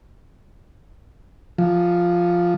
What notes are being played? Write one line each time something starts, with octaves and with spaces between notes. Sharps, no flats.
F3